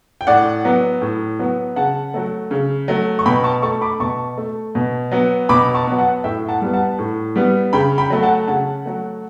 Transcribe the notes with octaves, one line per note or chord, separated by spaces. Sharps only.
G5
A2 D5 F#5
F#3 B3
A2
F#3 B3
C#3 F#5 A5
F#3 A3
C#3
F#3 A3
C#6
B2 G5 B5
A5 C#6
A3 A5 C#6
B5 D6
B2 A5 C#6
A3
B2
F#3 B3
B2 B5 D6
A5 C#6
F#3 B3
F#5 A5
A2 E5 G5
F#5 A5
G3 B3
F#5 A5
A2
G3 B3
C#3 G5 B5
G5 B5
F#3 A3
F#5 A5
C#3 F#5 A5
F#3 A3